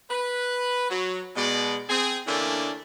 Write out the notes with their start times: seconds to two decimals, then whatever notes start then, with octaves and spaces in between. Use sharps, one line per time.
0.11 B4
0.90 F#3
1.36 B2 G#3 D5
1.90 C4 G#4
2.27 D3 E3 A3 A#3 C#4 D4